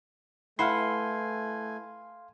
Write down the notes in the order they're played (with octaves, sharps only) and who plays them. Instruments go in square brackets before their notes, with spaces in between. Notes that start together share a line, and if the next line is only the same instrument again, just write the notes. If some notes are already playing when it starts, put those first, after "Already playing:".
[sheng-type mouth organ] A3 G#5 [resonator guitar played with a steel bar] E4 B4 F#5 [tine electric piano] F5 C6